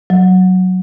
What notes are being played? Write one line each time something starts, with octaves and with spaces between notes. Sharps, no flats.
F#3